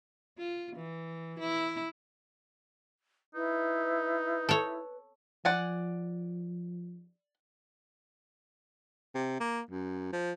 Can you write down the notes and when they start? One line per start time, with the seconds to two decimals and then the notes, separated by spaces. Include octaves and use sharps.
0.38 F4
0.76 E3
1.40 E4
3.35 D#4 E4 B4
4.49 A4 C#5
5.45 F3 D5 F#5 G#5
9.15 C3
9.40 A#3
9.71 F#2
10.12 F3